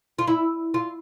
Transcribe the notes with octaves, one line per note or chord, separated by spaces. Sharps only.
F4
E4
F4